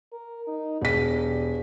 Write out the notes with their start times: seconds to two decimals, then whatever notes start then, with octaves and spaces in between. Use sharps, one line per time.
0.12 A#4
0.47 D#4
0.81 E1 G3 B6